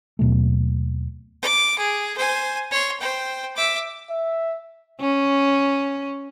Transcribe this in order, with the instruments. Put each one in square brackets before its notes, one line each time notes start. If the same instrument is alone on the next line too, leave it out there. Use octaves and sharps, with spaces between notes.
[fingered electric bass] D#2 B2 F#3 A3
[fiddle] D6
G#4
C5 G#5
C#5 C6
C5 G5
E5 D6
[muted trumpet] E5
[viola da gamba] C#4